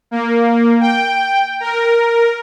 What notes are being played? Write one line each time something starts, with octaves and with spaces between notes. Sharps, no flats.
A#3
G5
A#4